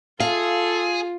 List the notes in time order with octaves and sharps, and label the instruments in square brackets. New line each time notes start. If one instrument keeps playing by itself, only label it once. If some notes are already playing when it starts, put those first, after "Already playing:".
[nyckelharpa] F4 [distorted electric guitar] G#4 [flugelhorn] A4 [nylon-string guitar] F5